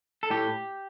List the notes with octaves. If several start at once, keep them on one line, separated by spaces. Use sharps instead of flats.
A4
A2 G4